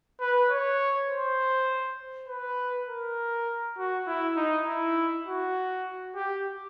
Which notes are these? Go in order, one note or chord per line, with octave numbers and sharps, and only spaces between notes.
B4
C#5
C5
B4
A#4
F#4
E4
D#4
E4
F#4
G4